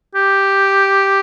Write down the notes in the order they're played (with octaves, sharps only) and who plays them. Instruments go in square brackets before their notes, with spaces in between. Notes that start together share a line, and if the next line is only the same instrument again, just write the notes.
[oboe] G4